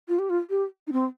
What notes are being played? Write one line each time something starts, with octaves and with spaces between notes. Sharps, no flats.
F4
G4
F4
G4
D#4
C4